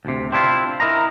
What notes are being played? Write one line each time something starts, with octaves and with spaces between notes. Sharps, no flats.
D2 C3
C4 D4 E4 F4
E4 A#4 D#5 A#5